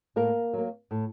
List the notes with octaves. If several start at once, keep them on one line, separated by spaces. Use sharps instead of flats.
A2 A#3 A#4
F#3 A#3
A2